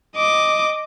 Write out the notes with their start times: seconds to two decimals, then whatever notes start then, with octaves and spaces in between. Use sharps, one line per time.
0.16 D#5 D6